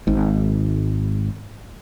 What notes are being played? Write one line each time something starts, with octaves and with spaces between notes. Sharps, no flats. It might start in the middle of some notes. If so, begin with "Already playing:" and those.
G#1 G#2